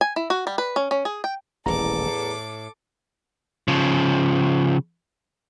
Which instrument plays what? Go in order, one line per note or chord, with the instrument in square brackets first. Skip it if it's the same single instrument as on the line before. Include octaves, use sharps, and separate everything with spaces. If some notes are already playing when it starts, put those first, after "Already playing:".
[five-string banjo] G#5
E4
F#4
G3
B4
C#4
C#4
G#4
G5
[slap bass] D#1 A1 [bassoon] E2 [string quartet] A4 D6 [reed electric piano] A#5
[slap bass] A2
[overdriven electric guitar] C#3 F3